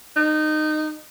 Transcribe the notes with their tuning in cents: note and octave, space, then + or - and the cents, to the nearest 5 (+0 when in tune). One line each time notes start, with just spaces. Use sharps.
D#4 -20